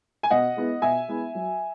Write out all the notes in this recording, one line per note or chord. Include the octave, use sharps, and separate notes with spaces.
G#5
B2 D#5 F#5
G#3 B3 E4
B2 E5 G#5
G#3 B3 E4
F#3